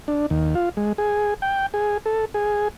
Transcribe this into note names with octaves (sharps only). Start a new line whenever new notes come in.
D4
D#2
F4
G#3
G#4
G5
G#4
A4
G#4